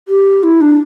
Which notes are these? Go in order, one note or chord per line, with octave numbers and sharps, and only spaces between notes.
G4
E4
D4